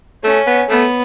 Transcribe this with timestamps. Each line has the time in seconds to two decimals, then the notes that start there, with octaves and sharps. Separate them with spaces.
0.24 A3 C#4
0.47 B3
0.69 A3 B3